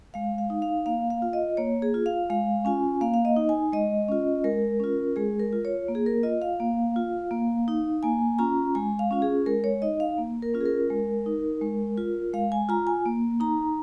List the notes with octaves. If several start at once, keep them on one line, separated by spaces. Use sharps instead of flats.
G#3 F5
F5
D#4
F5
A#3 F5
F5
F4
D#5
A#3 C#5
G#4
F4
F5
G#3 F5
C#4 F4 G#5
A#3 F5
F5
D#5
D#4
G#5
G#3 D#5
C#4 F4
G#3 A#4
C#4 F4
G#3 G#4
A#4
F4
C#5
A#3
G#4
A#4
F4 D#5
F5
A#3
F4
A#3
D#4
A#3 G#5
C#4 F4 A#5
G#3 G#5
F5
C#4 F4
G#4
G#3 A#4
C#5
D#4 D#5
F5
A#3
A#4
C#4 F4
G#4
A#4
G#3
D#4
G#3
F4
G#3 F5
G#5
F4 A#5
G#5
A#3
D#4 A#5